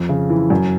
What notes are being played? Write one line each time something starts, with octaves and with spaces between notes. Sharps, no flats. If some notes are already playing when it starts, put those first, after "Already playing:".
Already playing: F2
C#3
E3
F#2